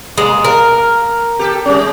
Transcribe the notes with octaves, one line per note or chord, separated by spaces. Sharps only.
G#3 A#3
A#4
G4 A4
G3 C#4